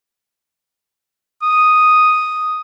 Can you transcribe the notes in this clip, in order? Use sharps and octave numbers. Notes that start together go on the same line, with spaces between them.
D#6